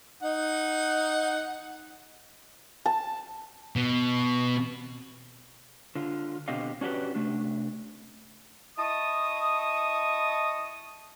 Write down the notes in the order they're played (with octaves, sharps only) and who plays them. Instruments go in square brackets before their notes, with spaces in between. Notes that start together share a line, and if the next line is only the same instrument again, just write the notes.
[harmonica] D#4 F#5
[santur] A5
[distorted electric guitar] B2
[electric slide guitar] D3 F4
B2 D3 C4 G4 D#5 F5
C#4 D4 F#4 G4 B4
C3 A3 D4
[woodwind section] E4 D#5 A5 C#6 D#6